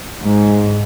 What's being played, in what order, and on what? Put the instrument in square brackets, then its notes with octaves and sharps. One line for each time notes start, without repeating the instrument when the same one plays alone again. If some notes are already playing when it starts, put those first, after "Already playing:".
[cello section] G#2